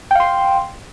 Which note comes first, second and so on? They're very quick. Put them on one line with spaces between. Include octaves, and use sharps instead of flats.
G5 F5 C6